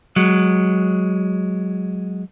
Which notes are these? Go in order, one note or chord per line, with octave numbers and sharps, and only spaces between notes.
F#3 G#3